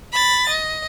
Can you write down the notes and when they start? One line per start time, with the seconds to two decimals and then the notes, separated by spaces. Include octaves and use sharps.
0.12 B5 A6
0.49 D#5